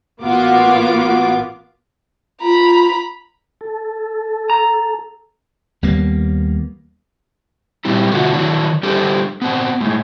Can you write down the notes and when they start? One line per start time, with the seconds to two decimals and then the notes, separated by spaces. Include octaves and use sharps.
0.22 A1 A#3 B3 F4 F#4 D6
2.42 F4 A#5 B5
3.61 A4
4.50 A#5
5.82 D#2 G3 A#3 B3
7.85 A#2 G3 C4 E4 G4
8.11 B2 D3 A3 D4 F4 F#4
8.34 D#3 F#3 D4 E4
8.83 G3 D4 G4 A4 C5
9.42 B3 C4 A5
9.81 A2 G#3